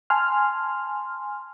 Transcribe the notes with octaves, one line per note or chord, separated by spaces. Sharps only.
G#5 A5 C6 F6